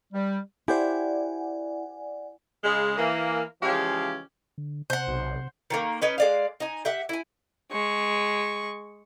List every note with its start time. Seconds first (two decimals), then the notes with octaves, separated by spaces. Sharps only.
0.12 G3
0.68 E4 G4 C5 D5 F#5 G#5
2.64 C#3 G#3
2.97 E3 A#3
3.62 C#3 E3 F3 G#3 C#4 G4
4.58 D3
4.90 C3 C5 F#5
5.07 B1
5.70 D#3 G#3 A#3
6.02 C#4 D#4 B4
6.18 G#3 D5 F5
6.60 D#4 G#5
6.85 G4 E5 F#5
7.09 E4 G#5
7.71 G#3 C#6